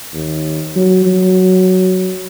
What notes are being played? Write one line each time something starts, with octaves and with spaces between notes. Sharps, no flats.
D#2
F#3
F#3